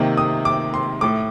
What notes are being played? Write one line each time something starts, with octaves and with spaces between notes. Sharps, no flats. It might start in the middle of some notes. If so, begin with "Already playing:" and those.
Already playing: C3 D#3 A#3
D#6
D6
C6
A2 A3 D6